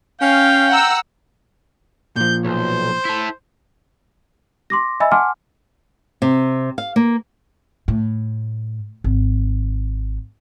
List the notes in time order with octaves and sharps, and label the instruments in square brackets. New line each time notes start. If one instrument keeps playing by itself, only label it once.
[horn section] C#4 F5 [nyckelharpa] G5
[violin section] F#5 A#5 E6
[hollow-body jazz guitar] A#2 F3 [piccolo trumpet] G6
[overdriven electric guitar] B1 [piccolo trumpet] C5
[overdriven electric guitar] E4 A4
[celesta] C6 D6 A#6
D#5 E5 G#5 B5 E6
F#5 G#5 A5 C6 D6 F6
[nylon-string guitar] C3
F5
A#3
[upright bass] A2
G#1